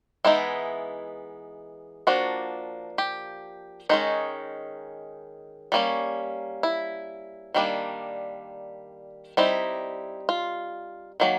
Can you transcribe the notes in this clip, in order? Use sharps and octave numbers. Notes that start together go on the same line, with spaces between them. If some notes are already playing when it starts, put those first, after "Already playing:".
E3 G#3 B3 D#4 E4
F3 A#3 D4 F#4
G4
D#3 G#3 C#4 D#4
G3 A#3 C#4
E4
D#3 G3 A#3 D4
G3 C4 D#4 E4
F4
D#3 F#3 A#3